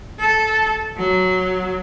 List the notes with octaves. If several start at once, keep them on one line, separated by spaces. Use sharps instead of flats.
A4
F#3